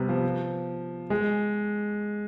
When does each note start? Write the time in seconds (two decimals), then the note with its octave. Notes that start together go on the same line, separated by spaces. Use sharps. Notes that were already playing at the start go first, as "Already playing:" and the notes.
Already playing: C3 G3 B3
0.09 F3
1.10 G#3